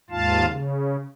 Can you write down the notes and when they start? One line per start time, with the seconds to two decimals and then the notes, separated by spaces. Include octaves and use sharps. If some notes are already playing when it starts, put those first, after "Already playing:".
0.10 D#2 G#2 F4 F5 A5
0.48 C#3